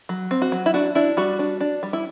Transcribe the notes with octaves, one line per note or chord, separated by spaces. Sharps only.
F#3
C4
F#4
F#3
E4
D4 F#4
D4 E4
G3 F#4
D4
D4
G3
E4